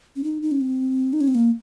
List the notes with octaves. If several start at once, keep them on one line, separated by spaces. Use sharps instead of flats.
C#4
D#4
D#4
C#4
C4
D#4
C#4
C4
A#3